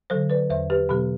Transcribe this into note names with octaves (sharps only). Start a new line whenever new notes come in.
D3 F#3 A4 C5
B4 D5
E2 C5 E5
G4 B4
B2 F#3 B3 G4